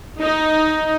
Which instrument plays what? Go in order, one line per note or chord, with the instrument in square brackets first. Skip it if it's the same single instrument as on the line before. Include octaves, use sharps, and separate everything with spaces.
[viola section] D#4